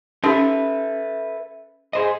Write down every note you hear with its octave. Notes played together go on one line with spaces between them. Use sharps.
C#4 D#4 G4 A4 B4 E5
G#4 C5 D#5